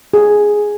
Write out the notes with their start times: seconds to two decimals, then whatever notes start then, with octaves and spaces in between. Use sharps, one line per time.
0.14 G#4